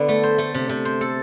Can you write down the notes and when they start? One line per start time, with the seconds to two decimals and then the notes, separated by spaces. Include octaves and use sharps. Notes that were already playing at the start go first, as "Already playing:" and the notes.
Already playing: D3 B3
0.08 A3
0.23 C5
0.38 A3
0.54 C3
0.69 C3
0.85 C5
1.01 A4